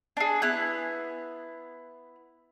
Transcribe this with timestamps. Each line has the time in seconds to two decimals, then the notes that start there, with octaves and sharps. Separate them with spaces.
0.17 D4 G#4
0.42 B3 E4 F#6